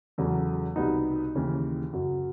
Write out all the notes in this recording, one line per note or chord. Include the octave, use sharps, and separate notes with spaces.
E2 C#3 F#3 A3
C2 B2 G3 B3 D#4
D#2 C#3 E3
F#2 C#3 F#3